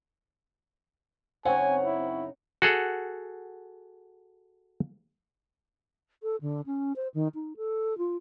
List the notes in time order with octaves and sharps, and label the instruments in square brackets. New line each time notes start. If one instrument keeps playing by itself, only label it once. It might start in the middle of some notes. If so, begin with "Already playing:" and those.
[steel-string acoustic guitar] F#2 C#3 D#4 [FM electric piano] C4 C#5 [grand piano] F#5 [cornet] G#5
[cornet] E4
[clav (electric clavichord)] F#4 G#4 A4 F#5
[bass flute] A4
D3
C#4
C5
D#3
D#4
A4
F4